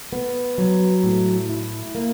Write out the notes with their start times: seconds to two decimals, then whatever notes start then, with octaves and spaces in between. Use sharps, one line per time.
0.13 B3
0.58 F#3
1.04 A2
1.49 E4
1.95 A#3